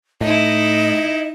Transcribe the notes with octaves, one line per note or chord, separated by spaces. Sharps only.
A2 D#4 E4 D#5